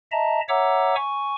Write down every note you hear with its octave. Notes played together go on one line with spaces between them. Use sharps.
D#5 E5 A5 A#5
C#5 E5 F#5 A#5 D6 E6
G#5 C#6